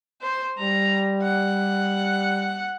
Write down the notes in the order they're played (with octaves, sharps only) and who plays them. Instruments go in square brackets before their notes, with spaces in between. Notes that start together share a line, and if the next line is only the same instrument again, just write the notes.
[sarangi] C5
[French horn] G3 [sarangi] A#5
[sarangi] F#5